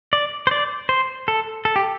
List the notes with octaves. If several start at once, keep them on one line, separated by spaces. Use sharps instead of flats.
D5
C5
D5
C5
A4
A4
G4